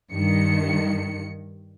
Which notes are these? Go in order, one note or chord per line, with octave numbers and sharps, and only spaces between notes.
G2 D#3 C#7